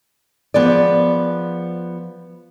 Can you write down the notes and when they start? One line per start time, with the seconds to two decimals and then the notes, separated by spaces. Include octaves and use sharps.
0.54 F3 B3 G#4 D5